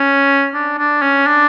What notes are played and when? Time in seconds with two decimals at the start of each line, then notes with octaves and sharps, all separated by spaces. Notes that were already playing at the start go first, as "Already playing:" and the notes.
Already playing: C#4
0.54 D4
0.79 D4
1.02 C#4
1.27 D4